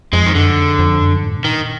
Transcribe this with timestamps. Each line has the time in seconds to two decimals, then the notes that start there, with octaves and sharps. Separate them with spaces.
0.13 F2 G#3
0.26 D#3
0.35 F#2 D3
0.56 F2
0.79 F2
1.00 F#2
1.22 G#2
1.38 B2
1.45 A#2 D#3